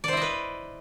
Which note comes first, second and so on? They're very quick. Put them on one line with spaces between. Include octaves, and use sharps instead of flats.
D5 C5 E4 D#5 B4